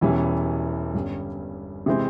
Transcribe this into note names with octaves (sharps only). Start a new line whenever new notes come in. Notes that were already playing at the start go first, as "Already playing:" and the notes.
E1 E2 E3 G3 C#4
G1 G2 G3 C#4
C3 E3 G#3 C4